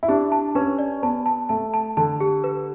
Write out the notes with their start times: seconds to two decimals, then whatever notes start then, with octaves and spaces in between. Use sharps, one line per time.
0.03 E4
0.08 D4 G4
0.32 A5
0.55 C#4 B4
0.79 D5
1.03 B3 A5
1.26 A5
1.49 A3 A5
1.74 A5
1.97 D3 A5
2.21 G4
2.44 B4